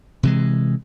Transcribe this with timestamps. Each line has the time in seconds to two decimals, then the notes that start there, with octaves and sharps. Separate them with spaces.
0.23 C3 E3 G#3